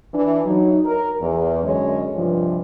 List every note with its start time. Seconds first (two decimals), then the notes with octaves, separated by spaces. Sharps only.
0.13 E3 D4
0.45 F#3 D#4
0.85 A#4
1.21 E2
1.64 F#2 D3 G#3 C#4 C#5 D#5
2.15 G2 C3 E3 F3